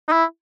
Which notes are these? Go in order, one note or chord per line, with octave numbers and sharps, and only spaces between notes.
D#4
E4